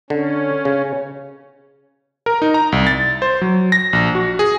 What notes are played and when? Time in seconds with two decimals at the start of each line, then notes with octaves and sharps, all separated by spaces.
0.10 D3 C#4
0.65 C#3
2.26 A#4
2.42 D#4
2.54 A#5
2.72 C2
2.87 A6
3.22 C5
3.42 F#3
3.72 A#6
3.93 A#1
4.15 F#4
4.39 G#4